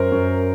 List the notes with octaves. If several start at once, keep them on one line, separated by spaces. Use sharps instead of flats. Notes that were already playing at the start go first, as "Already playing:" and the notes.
Already playing: F#2 A#4 C5
F#2